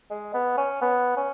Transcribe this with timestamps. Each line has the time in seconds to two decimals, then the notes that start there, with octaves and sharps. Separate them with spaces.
0.10 G#3
0.34 B3
0.57 C#4
0.82 B3
1.17 C#4